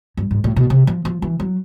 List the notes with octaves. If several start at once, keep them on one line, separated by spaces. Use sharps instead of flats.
G2
G#2
A2
B2
C3
F3
F3
E3
F#3